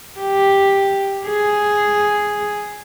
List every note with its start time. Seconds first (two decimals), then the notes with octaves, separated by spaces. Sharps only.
0.20 G4
1.27 G#4